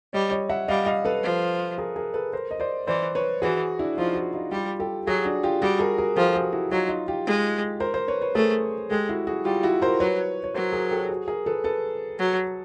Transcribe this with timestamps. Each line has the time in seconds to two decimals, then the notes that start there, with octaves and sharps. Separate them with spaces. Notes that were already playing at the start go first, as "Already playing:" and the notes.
0.13 G3 C#5 D#5
0.31 C#5 D#5
0.49 E5 F#5
0.68 G3 D#5 F5
0.86 D#5 F5
1.05 A4 B4
1.23 F3
1.78 G#4 A#4
1.96 G#4 A#4
2.14 A4 B4
2.33 A#4 C5
2.51 D#5
2.60 C5 D5
2.88 E3 C5 D5
3.15 B4 C#5
3.42 E3 F#4 G#4
3.79 D4 E4
3.98 F3 D#4 F4
4.15 E4 F#4
4.33 D#4 F4
4.51 G3 F4 G4
4.80 G4 A4
5.07 F#3 F#4 G#4
5.25 D4
5.43 F4 G4
5.62 G3 F#4 G#4
5.79 G#4 A#4
5.98 G#4 A#4
6.16 F3 G4 A4
6.35 F#4 G#4
6.53 E4 F#4
6.71 F#3 D#4 F4
6.89 D#4 F4
7.08 F4 G4
7.26 G#3
7.80 A#4 C5
7.94 A#4 C5
8.08 B4 C#5
8.21 B4 C#5
8.35 A3 G#4 A#4
8.90 G#3 G4 A4
9.09 E4 F#4
9.27 F#4 G#4
9.45 G3 F4 G4
9.63 E4 F#4
9.82 A#4 C5
10.00 F#3 B4 C#5
10.44 C#5
10.54 F#3 A#4 C5
10.73 G#4 A#4
10.91 G4 A4
11.09 F#4 G#4
11.28 G#4 A#4
11.46 A4 B4
11.64 A4 B4
12.19 F#3